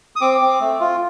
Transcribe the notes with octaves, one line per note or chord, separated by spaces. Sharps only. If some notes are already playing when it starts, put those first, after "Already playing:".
D#6
C4 D6
C4
A3
F4